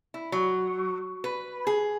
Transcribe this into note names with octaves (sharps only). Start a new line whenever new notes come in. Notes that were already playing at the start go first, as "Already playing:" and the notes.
E4
F#3
B4
G#4